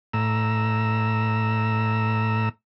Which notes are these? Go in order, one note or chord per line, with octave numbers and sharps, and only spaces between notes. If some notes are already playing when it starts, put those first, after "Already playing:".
A2 A#5 E6